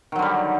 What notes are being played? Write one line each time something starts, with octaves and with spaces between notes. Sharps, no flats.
D3 D#3 F#3 G3